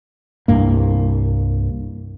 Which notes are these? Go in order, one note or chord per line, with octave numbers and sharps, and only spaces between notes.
C2 G2 A#3